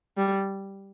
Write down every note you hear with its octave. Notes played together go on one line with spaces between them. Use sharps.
G3